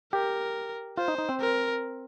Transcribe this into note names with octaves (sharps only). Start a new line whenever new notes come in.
G4 A#4
F4 C5
D#4
D#4
C4
A#4